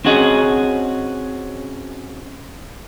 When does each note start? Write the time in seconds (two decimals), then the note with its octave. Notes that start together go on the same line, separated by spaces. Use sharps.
0.05 C4 C#4 F#4 G#4 D#5